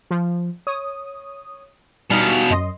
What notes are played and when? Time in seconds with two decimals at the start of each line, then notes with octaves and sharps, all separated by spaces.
0.11 F3
0.67 C#5 D#6
2.10 B2 G3 D#4 F5
2.50 F#2 D#5 C6